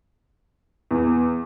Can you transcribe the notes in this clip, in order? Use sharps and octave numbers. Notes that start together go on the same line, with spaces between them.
E2